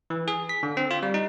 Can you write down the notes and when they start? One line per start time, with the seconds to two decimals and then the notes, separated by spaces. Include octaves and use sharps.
0.10 E3
0.28 G#4
0.49 B6
0.63 D3
0.77 C4
0.91 F4
1.03 G3
1.14 D#4